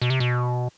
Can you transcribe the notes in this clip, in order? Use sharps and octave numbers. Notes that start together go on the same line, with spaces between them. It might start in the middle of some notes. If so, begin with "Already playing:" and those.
B2
C3
B2